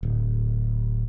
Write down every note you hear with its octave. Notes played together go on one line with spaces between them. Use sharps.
D1